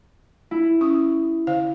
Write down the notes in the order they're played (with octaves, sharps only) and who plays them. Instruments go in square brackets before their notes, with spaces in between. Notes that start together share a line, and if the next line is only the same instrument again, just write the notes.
[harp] E4
[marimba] C#4 D#6
D3 C5 F5